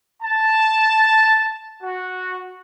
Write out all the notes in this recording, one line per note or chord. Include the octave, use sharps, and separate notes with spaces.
A5
F#4